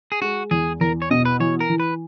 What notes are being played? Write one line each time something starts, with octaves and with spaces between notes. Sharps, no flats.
G#4
G#3 F#4
E2 G#4
E2 A#4
C#5
B2 D#5
B4
E3 C#5
A#4
E3
B4